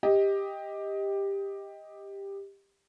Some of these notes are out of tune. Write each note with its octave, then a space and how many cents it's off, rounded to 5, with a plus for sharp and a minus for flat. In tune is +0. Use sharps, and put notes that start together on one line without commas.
G4 +10 D#5 +15